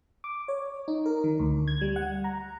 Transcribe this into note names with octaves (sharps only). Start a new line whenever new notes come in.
D6
C#5
D#4
A#4
D#3
D2
G#6
G3
F#5
A#5